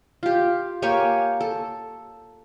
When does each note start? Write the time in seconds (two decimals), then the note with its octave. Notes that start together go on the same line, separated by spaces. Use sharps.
0.23 F4 G4
0.82 A#3 G4 C#5 G#5
1.41 A4